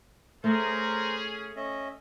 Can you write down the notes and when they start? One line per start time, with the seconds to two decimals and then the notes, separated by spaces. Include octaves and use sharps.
0.44 A3 C#4 G#4 A#4 C5 A#5
1.56 C#4 D#5 E5